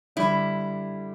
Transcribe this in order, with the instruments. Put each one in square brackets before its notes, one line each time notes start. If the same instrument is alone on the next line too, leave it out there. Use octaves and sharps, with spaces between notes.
[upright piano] D3 G3 D4 [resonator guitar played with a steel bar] E4